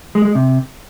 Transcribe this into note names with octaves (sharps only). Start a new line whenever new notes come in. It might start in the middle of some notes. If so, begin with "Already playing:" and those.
G#3
G#3
C3